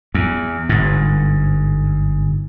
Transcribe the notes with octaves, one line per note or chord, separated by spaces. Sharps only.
E2
G1 G#2